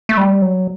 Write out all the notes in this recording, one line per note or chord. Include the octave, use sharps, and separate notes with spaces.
A3
G3
F#3